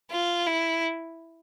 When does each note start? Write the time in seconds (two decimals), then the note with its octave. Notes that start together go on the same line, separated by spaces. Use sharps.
0.11 F4
0.46 E4